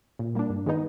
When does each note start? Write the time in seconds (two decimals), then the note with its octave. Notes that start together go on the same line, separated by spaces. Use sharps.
0.19 A#2
0.35 G3 A#3 D4
0.50 G2
0.66 D#3 G#3 B3 D#4